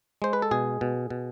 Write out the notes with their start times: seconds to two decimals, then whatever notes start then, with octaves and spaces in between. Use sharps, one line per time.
0.22 G#3 C5
0.33 B4
0.42 A4
0.51 B2 G#4
0.81 B2
1.10 B2